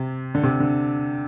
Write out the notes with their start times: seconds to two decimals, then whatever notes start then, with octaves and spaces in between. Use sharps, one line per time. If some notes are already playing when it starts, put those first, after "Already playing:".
Already playing: C3
0.35 D3
0.43 C3
0.60 D3